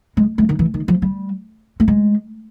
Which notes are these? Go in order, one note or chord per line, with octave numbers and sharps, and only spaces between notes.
G#3
G#3
D#3
E3
D#3
F3
G3
A3
G#3